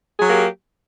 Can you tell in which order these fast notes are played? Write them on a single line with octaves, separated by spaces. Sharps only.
G#4 F#3 A#3 G4